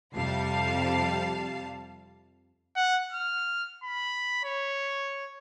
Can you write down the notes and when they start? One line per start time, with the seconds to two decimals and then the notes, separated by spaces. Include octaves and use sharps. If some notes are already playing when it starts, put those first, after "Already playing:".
0.12 F2 C3 G3 F5 A5 C7
2.76 F#5
3.13 F6
3.83 B5
4.44 C#5